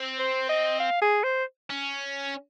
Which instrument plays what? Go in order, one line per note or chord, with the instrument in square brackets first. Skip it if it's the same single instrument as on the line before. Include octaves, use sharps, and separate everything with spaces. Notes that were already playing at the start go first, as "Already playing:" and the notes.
Already playing: [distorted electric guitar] C4
[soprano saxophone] C5
D#5
F5
G#4
C5
[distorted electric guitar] C#4